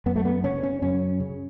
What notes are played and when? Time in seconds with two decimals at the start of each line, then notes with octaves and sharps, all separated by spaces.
0.06 F#2 B3
0.16 A3
0.25 B3
0.44 C#3 C#4
0.63 C#4
0.82 F#2 C#4
1.20 C#3